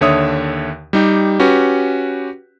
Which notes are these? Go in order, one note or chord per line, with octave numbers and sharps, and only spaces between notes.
D#2 D3 C#5 E5 D#6
G3 D#4 G4
C#4 F#4 G4 B4